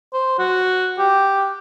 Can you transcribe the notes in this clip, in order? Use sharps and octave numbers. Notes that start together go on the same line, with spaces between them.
C5
F#4
G4